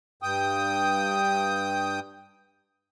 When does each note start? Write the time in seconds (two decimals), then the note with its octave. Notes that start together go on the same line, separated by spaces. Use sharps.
0.23 G2 G5 D#6